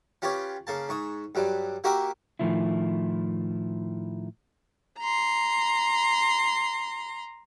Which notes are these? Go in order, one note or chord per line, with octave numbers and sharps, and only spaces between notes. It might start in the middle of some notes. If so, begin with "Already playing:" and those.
C#4 F4 G4 B4 C#5
C#3 A#3 A5
G#2 C#6 D#6
G2 F#3 G3
A#3 F#4 G4 A#4 E5 F#5
A2 D#3 F3 A3 E4
A#5 C6